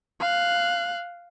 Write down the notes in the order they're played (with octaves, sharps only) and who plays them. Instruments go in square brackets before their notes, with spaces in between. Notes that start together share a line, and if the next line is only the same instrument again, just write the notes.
[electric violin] F5 F#6